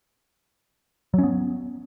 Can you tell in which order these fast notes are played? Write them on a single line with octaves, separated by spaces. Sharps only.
F#3 C#4 B3